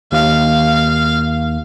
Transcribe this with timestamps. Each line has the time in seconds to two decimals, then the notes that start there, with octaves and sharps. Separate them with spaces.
0.12 D#2 F5